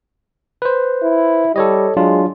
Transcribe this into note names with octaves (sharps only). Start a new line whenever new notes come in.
B4 C5
E4
G3 A4 C#5 D#5
F#3 G#3 D4 F4